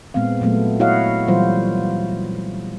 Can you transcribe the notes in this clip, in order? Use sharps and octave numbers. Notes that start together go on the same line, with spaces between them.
A#2 G#3 B3 C4 F5
A#2 F#3 A3 B3
E4 F#4 C#5 D#5 F5 F#5
A#2 E3 F#3 G3 F4 C5